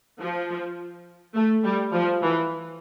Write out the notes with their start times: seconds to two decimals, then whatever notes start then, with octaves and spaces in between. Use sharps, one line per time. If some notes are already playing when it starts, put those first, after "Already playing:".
0.20 F3
1.35 A3
1.64 G3
1.94 F3
2.23 E3